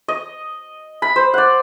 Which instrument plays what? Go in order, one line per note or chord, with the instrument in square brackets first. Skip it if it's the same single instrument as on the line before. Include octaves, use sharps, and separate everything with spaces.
[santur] D#5
B5
C5
D5 F#5